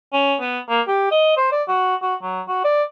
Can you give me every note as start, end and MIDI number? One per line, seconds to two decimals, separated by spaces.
0.13 0.36 61
0.41 0.59 59
0.69 0.81 58
0.88 1.07 67
1.11 1.35 75
1.37 1.48 72
1.52 1.63 74
1.68 1.95 66
2.02 2.15 66
2.22 2.42 54
2.48 2.64 66
2.64 2.83 74